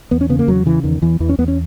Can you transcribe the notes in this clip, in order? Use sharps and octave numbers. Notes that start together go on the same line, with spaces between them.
E2 B3
C#4
C#3 B3
A#3
E2 F#3
C#3 E3
E2 D#3
E2 E3
E2 E3
C#4
E2 B3
C#4